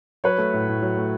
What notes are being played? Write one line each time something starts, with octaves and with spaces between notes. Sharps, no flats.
F#3 B4 C#5
A3
A2
A2
F#3
A3